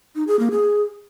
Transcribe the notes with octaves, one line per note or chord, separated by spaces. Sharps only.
D#4
G#4
A#3
G#4